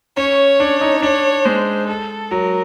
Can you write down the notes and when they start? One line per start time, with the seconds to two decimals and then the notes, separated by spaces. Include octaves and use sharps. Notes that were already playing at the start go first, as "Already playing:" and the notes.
0.17 C#4 C#5
0.60 D4
0.81 D#4
1.02 D4 C#5
1.45 G#3 C5
1.88 A4
2.31 F#3 A#4